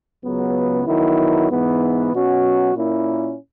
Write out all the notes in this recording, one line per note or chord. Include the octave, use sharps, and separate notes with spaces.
C#2 C#3 F#3 B3
D#3 F#3 B3 E4
G#2 E3 B3
B2 F#3 C#4 F#4
A#2 A#3 C#4 E4